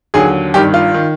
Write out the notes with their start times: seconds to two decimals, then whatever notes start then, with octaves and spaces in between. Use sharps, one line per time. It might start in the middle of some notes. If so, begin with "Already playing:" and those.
0.14 D#2 D3 F#3 G#4
0.54 G#1 G2 D#3 G4
0.74 F4
0.94 D#3